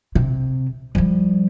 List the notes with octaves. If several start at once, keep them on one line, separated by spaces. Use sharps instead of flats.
C3
F3 G3